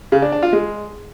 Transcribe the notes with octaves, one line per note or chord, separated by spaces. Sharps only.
C#3
D4
D4
F4
G#3